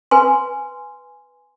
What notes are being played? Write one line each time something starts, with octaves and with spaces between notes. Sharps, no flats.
B4 G#5 C6